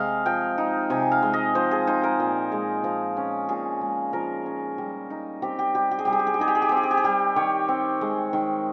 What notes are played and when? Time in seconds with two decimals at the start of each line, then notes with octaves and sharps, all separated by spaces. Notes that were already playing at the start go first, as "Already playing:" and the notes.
Already playing: C3 G#3 D#5 F5
0.26 F3 G5
0.58 D#4
0.90 C3 G#5
1.12 F5
1.23 G#3
1.33 D#5
1.55 F3 C5
1.71 G#4
1.87 D#4 C5
2.03 A#4
2.20 A#2
2.52 G#3
2.84 F3
3.17 C#4
3.49 A#2 G#4
3.81 G#3
4.13 F3 A#4
4.46 C#4
4.78 G3
5.10 D#4
5.42 C4 G4
5.59 G4
5.75 G3 G4
5.91 G4
5.99 G#4
6.05 G3 G4
6.13 G#4
6.19 G4
6.27 G#4
6.34 G4
6.39 D#4 G#4
6.48 G4
6.55 G#4
6.62 G4
6.69 C4 G#4
6.77 G4
6.83 G#4
6.91 G4
6.97 G#4
7.04 G3 G4
7.36 D#3 C#5
7.68 C4
8.01 G#3
8.33 D#3